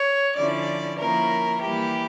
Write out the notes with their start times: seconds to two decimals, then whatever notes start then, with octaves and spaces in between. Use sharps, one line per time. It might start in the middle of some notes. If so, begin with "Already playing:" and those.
Already playing: C#5
0.37 D3 F3 C#4 E4 D5
0.99 F3 A#3 C#4 E4 A#4
1.61 E3 G3 A#3 E4 G4